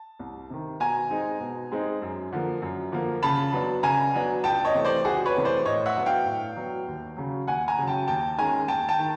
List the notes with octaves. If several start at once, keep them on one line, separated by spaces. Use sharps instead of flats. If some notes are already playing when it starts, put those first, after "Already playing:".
Already playing: A5
C2
C3 D#3
B2 G#5 A#5
G#3 C4 D#4
B2
G#3 C4 D#4
F#2
D3 F3 A#3
F#2
D3 F3 A#3
C#3 A5 B5
F#3 B3 D4
C#3 G#5 A#5
F#3 B3 D4
C#2 G5 A5
C#5 D#5
C3 E3 A3
C5 D5
C#2 F#4 G#4
B4 C#5
C3 E3 A3
C5 D5
A2 C#5 D#5
E5 F#5
F#3 B3 D4
F5 G5
A2
F#3 B3 D4
D#2
C#3 F#3
D#2 F#5 G#5
G#5 A#5
C#3 F#3
G5 A5
D#2 G5 A5
D#3 G#3 C#4 G#5 A#5
D#2 G5 A5
G5 A5
D#3